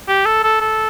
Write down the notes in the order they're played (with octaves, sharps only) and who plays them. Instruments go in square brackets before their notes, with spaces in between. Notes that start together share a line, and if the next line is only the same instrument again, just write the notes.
[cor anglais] G4
A4
A4
A4